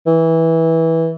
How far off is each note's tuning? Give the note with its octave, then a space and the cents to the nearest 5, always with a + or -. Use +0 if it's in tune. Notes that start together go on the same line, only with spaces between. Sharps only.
E3 -15